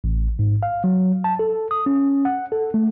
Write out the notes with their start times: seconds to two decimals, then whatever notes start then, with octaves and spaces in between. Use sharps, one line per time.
0.04 A1
0.39 G#2
0.63 F5
0.84 F#3
1.24 A5
1.39 A4
1.71 D#6
1.86 C#4
2.25 F#5
2.52 A4
2.74 A3